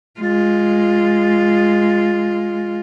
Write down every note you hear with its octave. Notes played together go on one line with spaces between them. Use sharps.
G#3 F4